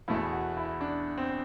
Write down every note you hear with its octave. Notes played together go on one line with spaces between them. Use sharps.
E2 B2 A3 E4
F#4
E4
D4
C4